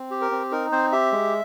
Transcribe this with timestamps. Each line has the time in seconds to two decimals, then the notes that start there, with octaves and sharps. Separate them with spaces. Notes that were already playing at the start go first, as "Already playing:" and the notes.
Already playing: C4
0.11 G4
0.21 A#4
0.31 C4
0.52 D#4 A#4
0.72 C4 C5
0.92 G4 E5
1.12 G#3